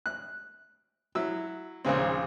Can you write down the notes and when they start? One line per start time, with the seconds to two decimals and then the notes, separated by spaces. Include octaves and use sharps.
0.06 F#6
1.15 F#3 E4 E6
1.85 A#1 D#2 C#3 C4